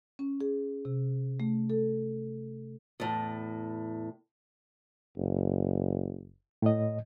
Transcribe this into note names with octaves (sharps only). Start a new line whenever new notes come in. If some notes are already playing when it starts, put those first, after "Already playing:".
C#4
G#4
C3
A3
A4
E2 A2
F#1
A2 D#5